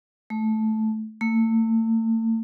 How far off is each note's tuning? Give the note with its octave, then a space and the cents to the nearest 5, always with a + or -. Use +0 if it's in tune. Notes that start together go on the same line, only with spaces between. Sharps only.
A3 -10
A3 +40